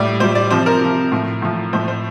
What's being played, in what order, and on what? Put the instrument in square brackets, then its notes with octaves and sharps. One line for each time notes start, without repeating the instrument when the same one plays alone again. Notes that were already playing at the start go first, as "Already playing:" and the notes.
Already playing: [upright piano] A2 G3 D5
A2 G3 C5
D5
C3 F3 C5
A#4
C3 F3
A2 F3
A2 F3
A2 F3 C5
C5